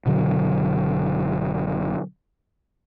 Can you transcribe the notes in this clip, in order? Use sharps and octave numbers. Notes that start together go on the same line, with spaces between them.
F#1 B2 D3 F#3